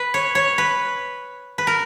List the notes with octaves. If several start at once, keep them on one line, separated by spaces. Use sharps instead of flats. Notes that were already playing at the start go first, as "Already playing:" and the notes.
Already playing: B4
C#5
C#5
B4
B4
A#4